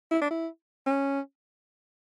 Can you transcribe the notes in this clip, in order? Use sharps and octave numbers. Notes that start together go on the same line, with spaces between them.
E4
D4
E4
C#4